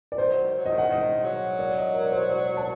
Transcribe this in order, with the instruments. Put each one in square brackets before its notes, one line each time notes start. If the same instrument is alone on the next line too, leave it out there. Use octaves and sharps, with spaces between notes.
[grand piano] D5
[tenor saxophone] D#3 [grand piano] C5
[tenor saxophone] F#3
D#3
F#3
[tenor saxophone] D#3 [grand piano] D#5
[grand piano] F#5
[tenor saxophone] D#3 [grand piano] D#5
[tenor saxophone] F#3
[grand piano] D5
D#5
A#4
D5
C5
D5
A5